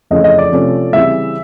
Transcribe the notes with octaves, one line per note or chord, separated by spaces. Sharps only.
F2 C#3 E3 A3 C#4 D#5
D#5
D5
C3 F3 A3 C#4
C#3 E3 G3 C4 E5